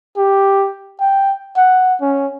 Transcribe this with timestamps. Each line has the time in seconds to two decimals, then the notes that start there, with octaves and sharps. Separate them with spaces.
0.17 G4
1.01 G5
1.57 F#5
2.02 C#4